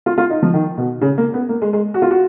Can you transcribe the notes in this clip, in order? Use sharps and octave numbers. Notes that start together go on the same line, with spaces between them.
F4
F4
D#4
F3
D#3
B2
C#3
A#3
B3
A#3
G#3
G#3
F#4
F4
F#4